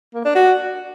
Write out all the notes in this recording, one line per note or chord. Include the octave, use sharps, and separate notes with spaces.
A#3
D4
F#4